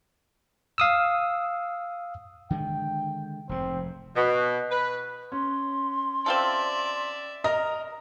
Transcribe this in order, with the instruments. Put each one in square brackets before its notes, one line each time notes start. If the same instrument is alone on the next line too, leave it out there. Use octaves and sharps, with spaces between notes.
[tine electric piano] F5 D#6 E6
[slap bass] D3 D#3 G#3 [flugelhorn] G5
[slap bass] F1 G#2 [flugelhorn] C4
[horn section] B2
B4
[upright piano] C#4 [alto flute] C6
[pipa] C4 F4 A4 [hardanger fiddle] D5 E5
[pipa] A#4 [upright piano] D#5 A#5